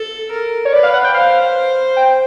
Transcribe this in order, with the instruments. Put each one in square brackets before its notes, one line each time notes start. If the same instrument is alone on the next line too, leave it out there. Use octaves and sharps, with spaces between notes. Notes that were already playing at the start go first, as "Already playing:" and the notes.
Already playing: [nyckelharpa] A4
A#4
[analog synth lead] C#5
[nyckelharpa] B4 [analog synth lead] D5
[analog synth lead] F5
F#5
G5
[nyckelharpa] C5 [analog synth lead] F5
[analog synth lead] G5